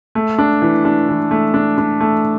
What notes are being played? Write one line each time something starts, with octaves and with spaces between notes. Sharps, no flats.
A3
D4
E3
D4
E3
A3
D4
D4
A3